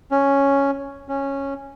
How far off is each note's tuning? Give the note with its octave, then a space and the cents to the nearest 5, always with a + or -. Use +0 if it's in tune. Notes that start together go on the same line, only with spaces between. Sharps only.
C#4 +0
C#4 -10